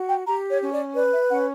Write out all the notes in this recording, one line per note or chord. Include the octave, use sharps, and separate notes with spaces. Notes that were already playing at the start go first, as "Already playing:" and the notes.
Already playing: F#4
G5
G4 A#5
C#5
C#4
D5
B4 D5
E5
C#4 F#5